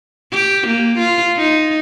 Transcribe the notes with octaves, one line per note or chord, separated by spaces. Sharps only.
G4
A#3
F4
D#4